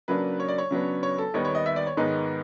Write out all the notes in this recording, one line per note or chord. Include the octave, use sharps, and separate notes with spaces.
C#3 F#3 A#3 D4 B4
C#5
D5
C#5
C#3 F#3 B3 D4
C#5
A4
D#2 D#3 G3 B3 D#4 C#5
C#5
D#5
E5
D5
C#5
G#2 D#3 G#3 B3 D#4